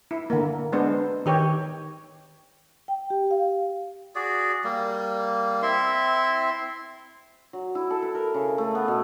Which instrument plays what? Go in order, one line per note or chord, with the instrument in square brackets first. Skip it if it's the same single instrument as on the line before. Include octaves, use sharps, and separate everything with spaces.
[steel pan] E4
D3 A#3
G#3 B3 D4 C5
D#3 G4 C#5
[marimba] G5
G4
F5
[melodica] F#4 G#4 D5
G3 A#3
C4 E4 E5 C6
[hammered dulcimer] F#3
E4
A4
B4
A#4
C#3
A3
B3
B2